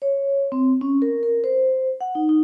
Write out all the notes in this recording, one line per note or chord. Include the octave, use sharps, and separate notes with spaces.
C#5
C4
C#4
A#4
A#4
C5
F#5
D#4
D#4